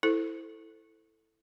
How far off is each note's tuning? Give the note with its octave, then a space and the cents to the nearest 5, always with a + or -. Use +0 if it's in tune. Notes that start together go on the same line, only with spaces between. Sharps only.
E4 +0 A4 +5 C5 -10